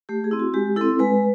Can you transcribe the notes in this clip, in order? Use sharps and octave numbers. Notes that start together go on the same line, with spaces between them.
A3 G4
G#4
C4 E4
F#4
G#3 G4
C4 E4 A4
G#3 B4